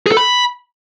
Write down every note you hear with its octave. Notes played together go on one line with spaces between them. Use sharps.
G#4
A4
B5